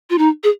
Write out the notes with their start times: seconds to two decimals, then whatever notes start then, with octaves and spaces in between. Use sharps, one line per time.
0.10 F4
0.18 D#4
0.44 G#4